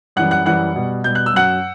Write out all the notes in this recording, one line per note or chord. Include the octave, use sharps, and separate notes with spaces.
F#2 E3 G3 F#5 F#6
F#5 F#6
F#2 E3 G3 F#5 F#6
B2 G3
B2 G3 G6
F#6
E6
F#2 F#3 F#5 F#6